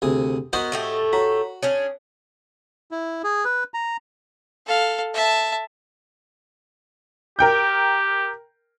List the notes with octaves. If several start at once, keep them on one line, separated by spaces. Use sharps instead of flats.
D2 C3 G#4
B3 F#4 A#4 C5 D#5 C#6 G6
A2 A3 G4
F#4 C#5 A#5 B6
C#4 D4 G#4 C#5
E4
G#4
B4
A#5
A4 F5
E5 A5
G4 A#4 G5 G6